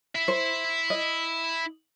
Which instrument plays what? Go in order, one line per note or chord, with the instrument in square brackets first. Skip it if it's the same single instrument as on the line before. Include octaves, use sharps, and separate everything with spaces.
[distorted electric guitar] E4 E5
[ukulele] C5
D#5